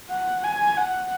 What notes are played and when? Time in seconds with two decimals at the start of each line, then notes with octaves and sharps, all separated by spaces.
0.10 F#5
0.43 G#5
0.77 F#5